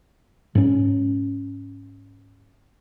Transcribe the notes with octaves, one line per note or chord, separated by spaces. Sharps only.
G#2 C#4